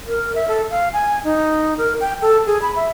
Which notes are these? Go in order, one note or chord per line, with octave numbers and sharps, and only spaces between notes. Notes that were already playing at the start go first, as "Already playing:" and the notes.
A#4
E5
A4
F5
G#5
D#4
A#4
G5
A4
G#4
B5
E5